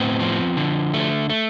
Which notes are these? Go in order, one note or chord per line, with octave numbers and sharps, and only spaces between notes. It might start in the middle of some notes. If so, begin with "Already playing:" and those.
Already playing: A2 B3 C4
F3
D3
A3
A3